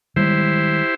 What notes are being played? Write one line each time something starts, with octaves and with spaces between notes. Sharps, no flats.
D#3 G3 G#3 E4 G4 C5